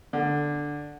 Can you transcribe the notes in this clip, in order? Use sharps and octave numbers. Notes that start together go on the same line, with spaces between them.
D3